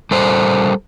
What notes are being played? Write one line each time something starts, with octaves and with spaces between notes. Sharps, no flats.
G3 A4 A#4 C5